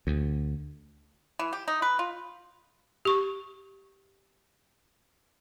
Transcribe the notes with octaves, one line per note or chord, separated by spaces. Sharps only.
D2
E3
G4
D#4
B4
F4
G4 C#6